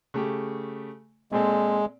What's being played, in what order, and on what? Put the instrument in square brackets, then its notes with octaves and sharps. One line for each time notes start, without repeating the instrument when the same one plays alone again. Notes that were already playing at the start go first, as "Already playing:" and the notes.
[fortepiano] C#3 A3 G4
[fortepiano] A#2 C4 A4 [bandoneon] G#3